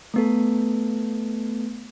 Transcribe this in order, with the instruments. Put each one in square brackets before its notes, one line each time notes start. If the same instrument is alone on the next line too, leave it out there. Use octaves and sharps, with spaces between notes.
[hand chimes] A3 B3 A4